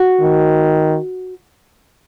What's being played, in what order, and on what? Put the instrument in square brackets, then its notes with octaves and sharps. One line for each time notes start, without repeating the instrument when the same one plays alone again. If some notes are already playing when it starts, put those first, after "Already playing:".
Already playing: [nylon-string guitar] F#4
[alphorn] D#3